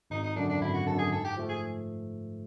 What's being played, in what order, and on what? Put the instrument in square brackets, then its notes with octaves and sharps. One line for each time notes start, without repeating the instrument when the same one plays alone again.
[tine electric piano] G#1 [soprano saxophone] D#4
[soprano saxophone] D#4
[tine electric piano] F#2 D3 [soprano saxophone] D4
[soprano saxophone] D4
[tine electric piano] G#1 [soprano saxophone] E4
[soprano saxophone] F#4
[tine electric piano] F#2 D3 [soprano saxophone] A4
[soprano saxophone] G#4
[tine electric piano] G#2 [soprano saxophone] A4
[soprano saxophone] G4
[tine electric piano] F3 A3
[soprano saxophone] G#4